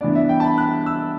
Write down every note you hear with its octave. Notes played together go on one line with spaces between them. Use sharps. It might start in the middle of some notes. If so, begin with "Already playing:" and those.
G2 E3 B3 D4 D5
E5
G5
A5
B5
F#6
E6